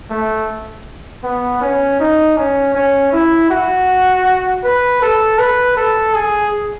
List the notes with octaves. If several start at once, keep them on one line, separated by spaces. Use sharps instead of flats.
A3
B3
C#4
D#4
C#4
C#4
E4
F#4
B4
A4
B4
A4
G#4